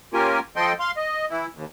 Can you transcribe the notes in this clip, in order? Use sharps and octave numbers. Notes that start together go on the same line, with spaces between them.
A#3 C#4 F4 G4 A#4 G#5
F3 A4 D#5 G5 C6
F5 C6
D#5
E3 E4
D#2